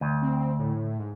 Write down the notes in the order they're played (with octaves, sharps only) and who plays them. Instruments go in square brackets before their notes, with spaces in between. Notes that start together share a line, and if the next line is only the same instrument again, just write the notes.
[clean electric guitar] D2
[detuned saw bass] C4
A2
G#2